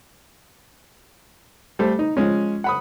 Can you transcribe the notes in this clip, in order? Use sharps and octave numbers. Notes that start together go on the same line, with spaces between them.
G3 A3 A4 C5
D#4
F3 G#3 C#4
F#5 B5 D#6